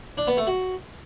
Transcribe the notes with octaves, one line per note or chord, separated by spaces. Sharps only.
D4
B3
A3
F#4